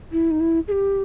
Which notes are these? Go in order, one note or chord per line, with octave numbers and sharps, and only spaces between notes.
E4
D#4
E4
G#4
G4